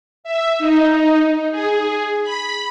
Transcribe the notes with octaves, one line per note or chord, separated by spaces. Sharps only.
E5
D#4
G#4
B5